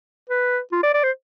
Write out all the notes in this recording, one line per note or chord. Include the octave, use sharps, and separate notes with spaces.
B4
F4
D5
D5
C5